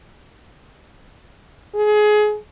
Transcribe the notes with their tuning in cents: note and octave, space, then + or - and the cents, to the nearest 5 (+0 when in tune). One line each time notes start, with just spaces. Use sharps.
G#4 +25